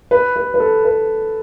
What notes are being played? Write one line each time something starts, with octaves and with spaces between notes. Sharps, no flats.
B4
B4
B4
A4
B4